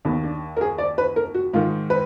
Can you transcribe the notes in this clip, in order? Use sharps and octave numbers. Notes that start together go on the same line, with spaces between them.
D#2 D#3 B3
D4
A#4
G#4
D5
B4
A#4
F#4
G#2 D#3 F4
B4